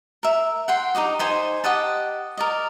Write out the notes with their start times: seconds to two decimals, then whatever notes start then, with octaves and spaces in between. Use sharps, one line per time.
0.23 A#4 E5
0.68 F#5 G5 C6
0.95 D#4 F#4 G4 D#5
1.19 D#4 C5 G#5
1.64 G4 D#5 F#5 A5
2.37 A#4 D5 D#5